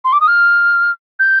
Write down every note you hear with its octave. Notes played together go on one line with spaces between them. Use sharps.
C6
D6
D#6
F6
G6